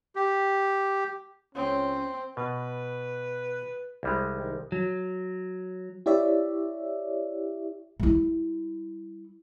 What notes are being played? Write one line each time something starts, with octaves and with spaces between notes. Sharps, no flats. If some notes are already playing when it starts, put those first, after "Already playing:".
G4
C#2 C4 C#4
B2 B4
C2 G3 G#3
D#3
F#3
E4 G4 C#5 D5 E5
G3 E4